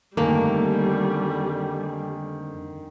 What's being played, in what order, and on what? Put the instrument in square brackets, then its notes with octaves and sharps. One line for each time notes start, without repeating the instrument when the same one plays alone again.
[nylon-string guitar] F2 D3 A3 [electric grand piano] D#3 G#5 [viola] G3 [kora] A#3